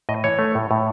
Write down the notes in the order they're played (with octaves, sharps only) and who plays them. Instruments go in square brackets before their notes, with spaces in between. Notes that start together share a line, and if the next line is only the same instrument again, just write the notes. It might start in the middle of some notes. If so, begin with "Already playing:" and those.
[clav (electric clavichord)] A2 D#5
E3 C#5
A3
A2
A2